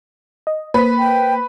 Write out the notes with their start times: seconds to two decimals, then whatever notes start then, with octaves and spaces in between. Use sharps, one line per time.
0.47 D#5
0.74 A#3 B4 C5 B6
0.98 G5